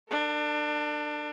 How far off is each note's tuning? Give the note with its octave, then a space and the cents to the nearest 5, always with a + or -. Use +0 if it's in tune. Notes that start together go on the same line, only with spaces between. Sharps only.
D4 +25 A#4 -45